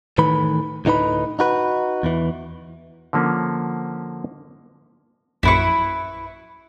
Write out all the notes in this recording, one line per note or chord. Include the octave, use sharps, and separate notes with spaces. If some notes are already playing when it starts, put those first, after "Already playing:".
A2 D#3 E3 B4 B5
D2 A2 D#4 B4 B5
D#4 F#4 B4
E2 E3
D3 F3 A#3 C#4
A#1 F#2 E4 B4 C#6